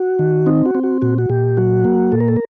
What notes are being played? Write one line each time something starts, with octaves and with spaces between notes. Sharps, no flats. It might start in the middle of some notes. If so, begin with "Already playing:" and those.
Already playing: F#4
D#3
C4 D#4
F#4
C4
F#4
A#2 F#4
F#4
A#2 G4
F#3 F#4
A#3
A#2 A4
A#4
A4
A#4